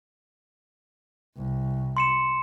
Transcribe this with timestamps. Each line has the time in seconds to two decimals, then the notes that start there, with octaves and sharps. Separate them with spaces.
1.37 C2
1.97 C6 C#7 E7